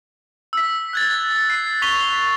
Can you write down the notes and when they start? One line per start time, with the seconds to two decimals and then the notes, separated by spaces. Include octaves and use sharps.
0.53 E6 B6
0.93 F#6 G#6 A6
1.50 C7
1.82 C#6 A6 B6 F7 G7